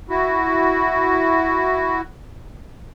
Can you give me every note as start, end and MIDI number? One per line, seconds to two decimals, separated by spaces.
0.10 2.01 64
0.10 2.01 66